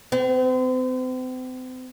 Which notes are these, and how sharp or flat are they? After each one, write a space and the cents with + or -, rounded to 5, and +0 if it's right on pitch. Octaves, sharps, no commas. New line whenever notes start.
C4 -40